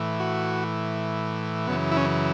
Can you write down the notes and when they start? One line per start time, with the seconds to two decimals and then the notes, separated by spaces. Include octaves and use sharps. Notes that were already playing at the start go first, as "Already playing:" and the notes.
Already playing: A2 E3
0.20 F#4
1.67 F#2 C#3 E3 B3
1.91 E4
1.97 C#4